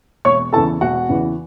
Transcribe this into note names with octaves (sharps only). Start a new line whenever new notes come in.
E1 C#5 C#6
E2 C#3 E3 A4 A5
E1 F#4 F#5
E2 C#3 E3